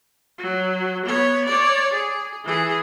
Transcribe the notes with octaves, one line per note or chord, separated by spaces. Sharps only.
F#3
B3 C#5
C#5 D5
G#4
E3 G#4